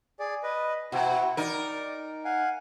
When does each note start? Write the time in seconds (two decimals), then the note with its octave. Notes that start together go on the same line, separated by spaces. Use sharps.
0.20 G#4 D5
0.43 B4 D#5
0.92 B2 E4 F#4
1.37 D#4 A#4 D5
2.25 F5 F#5 G#5